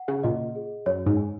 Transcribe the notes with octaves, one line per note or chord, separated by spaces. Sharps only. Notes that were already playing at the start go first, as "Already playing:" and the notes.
Already playing: F#5
C#3
A#2 D#5
G#4
F#2 C#5
G#2
G#5